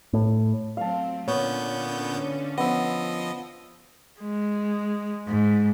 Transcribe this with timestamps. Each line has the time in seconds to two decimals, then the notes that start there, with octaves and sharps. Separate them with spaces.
0.13 A2
0.77 F#3 A3 C4 F5 A5
1.28 A#2 D3 B3 C#4 C#5 G6
2.58 F3 B3 D#5 E6
4.20 G#3
5.28 G#2